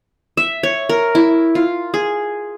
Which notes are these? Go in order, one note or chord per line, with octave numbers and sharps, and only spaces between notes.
E5
C#5
A#4
E4
F4
G#4